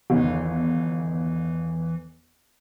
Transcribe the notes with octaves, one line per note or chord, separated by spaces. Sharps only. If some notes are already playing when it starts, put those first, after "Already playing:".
G1 E2 D#3 E3